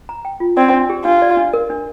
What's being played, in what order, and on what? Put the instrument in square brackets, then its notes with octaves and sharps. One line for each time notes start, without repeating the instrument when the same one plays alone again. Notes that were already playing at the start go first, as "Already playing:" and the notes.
[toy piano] A#5
G5
F4
[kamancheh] C4 [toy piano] D5
[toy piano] D4
G4
[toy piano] D4 [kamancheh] F4
[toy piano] D5
D4
A#4
D4